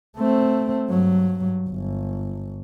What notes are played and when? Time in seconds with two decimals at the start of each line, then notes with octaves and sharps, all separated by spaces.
0.17 A3 C4
0.89 G2 F#3
1.69 G1